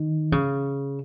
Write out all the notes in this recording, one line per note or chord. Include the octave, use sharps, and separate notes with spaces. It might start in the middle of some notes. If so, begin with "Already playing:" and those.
Already playing: D#3
C#3